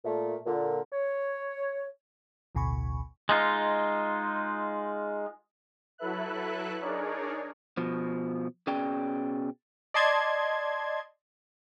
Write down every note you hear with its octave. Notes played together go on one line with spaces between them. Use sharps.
A#2 A3
A#2 D3
C#5
A1 D2 B2 G#5 B5 C#6
G#3 D#4 F4
F#3 E4 A4 B4 E5 F#6
D4 D#4 G#4 A#4 C#5 D5
B2 F3
B2 C#4 G#4 D5 G5
D5 D#5 A5 C6 G#6